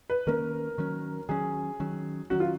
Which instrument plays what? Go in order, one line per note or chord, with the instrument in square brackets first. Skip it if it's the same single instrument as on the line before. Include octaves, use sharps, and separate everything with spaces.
[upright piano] B4
[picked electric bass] D#3 A#3 C#4 [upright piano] A#4
[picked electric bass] D#3 F#3 C#4
[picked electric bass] D#3 F#3 C#4 [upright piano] G#4
[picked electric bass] D#3 F#3 C#4
[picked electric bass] D#3 F#3 C#4 [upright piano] F#4
[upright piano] F4